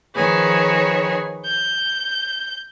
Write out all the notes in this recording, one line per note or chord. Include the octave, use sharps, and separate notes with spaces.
D#3 F3 G#4 B4 C#5
G6